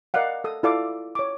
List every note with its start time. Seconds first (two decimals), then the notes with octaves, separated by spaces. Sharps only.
0.14 A#4 D5 D#5 F5 F#5
0.44 A4 D#6
0.63 E4 F4 A4 D5 F5 D6
1.15 C#5 D6